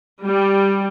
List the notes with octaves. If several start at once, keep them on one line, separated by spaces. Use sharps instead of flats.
G3